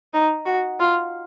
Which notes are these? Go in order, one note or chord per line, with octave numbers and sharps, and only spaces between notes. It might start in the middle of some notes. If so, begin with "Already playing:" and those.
D#4
F#4
F4